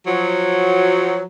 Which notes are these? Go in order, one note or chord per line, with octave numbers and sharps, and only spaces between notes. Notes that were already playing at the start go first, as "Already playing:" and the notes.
F3 F#3